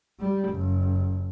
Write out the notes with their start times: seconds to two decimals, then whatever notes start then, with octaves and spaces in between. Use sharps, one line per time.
0.19 G3
0.49 F#1